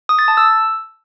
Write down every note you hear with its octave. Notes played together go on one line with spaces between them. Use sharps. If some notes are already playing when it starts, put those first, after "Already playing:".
D#6
A6
A5
E6